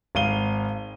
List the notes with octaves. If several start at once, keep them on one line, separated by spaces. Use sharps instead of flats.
G#1 F5 D#7 G7